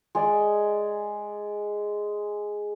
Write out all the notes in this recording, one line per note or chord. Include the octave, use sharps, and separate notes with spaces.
G#3 G#4 D5